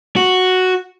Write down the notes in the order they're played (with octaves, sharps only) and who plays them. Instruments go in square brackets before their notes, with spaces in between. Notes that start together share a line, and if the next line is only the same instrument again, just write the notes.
[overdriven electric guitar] F#4